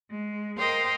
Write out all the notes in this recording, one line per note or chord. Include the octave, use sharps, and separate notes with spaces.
G#3
A#4 C5 D#5 F5 G5